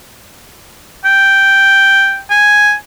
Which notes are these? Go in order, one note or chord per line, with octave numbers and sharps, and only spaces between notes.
G5
G#5